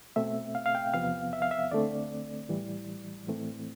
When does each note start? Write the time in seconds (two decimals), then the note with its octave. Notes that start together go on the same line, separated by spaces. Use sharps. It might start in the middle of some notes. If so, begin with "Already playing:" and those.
0.16 B2 A3 C4 E5
0.55 F5
0.66 F5
0.75 G5
0.94 E2 C3 F3 B3 F5
1.33 E5
1.42 F5
1.51 E5
1.71 D2 D3 A3 C4 D5
2.49 A2 E3 G3
3.27 A2 E3 A3 C4